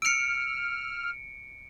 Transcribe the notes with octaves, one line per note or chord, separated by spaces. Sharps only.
E6 F6 C#7 D7